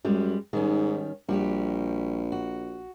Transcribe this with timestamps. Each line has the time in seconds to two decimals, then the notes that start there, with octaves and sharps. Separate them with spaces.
0.05 F#2 G3 G#3
0.53 G#2 D#3 G3 C#4
1.29 A#1 G3 F#4 G4
2.32 F#4